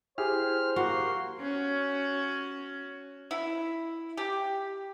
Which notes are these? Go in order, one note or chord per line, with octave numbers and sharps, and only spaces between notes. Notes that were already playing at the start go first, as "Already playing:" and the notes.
E4 G4 G#4 C5 F6
A#3 F#4 C6
C#4 F#4
E4
G4